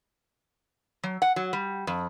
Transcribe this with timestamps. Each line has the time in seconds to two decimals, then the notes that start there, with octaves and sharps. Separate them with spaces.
1.04 F#3
1.22 F#5
1.36 F#3
1.53 G3
1.87 F2